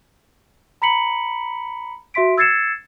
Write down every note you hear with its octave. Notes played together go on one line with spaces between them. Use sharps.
A#5 B5 B6 C#7 F#7
F#4 E5 C6 B6 D7
E6 G#6 A6 C7 C#7 E7